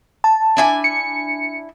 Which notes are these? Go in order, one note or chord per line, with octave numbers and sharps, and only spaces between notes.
A5
D4 E4 G#5
C#7